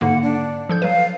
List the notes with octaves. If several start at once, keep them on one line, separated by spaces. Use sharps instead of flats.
G#2 D3 A#3 F#5
D4
F3 A4 G6
F#3 B4 F5